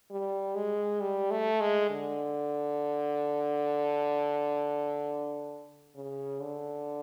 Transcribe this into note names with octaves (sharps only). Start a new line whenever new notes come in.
G3
G#3
G3
A3
G#3
D3
C#3
D3